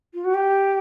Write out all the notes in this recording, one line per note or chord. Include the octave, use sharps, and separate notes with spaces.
F4
F#4
G4